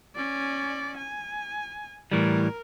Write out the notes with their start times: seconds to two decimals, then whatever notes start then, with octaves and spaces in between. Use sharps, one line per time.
0.16 C#4 D5
0.97 G#5
2.12 A2 E3 G3 A#4